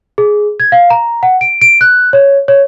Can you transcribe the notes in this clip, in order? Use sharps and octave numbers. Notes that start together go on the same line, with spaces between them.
G#4
G#6
F5
A#5
F#5
D7
D7
F#6
C#5
C#5